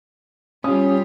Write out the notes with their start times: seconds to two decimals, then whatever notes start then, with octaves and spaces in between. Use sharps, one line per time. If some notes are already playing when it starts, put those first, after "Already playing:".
0.64 G3 C#4 F4 G4 D#6